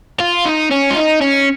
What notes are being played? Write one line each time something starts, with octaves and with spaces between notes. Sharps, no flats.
F4
D#4
C#4
F4
D#4
C#4